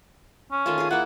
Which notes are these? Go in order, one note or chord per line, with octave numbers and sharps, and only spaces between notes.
C#4
D#3 A3 F4
F4 G#4
A#3 E4 F#5